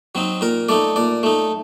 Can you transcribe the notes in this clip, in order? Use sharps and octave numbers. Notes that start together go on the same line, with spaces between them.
F#3 C4 D#4
A#2 A#4
A3 D#4 D5
A#2 D5
A3 D#4